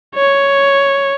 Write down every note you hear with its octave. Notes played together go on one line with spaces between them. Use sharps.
C#5